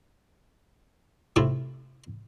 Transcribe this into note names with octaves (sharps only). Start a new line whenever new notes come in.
A2 C3 A3 E4 F4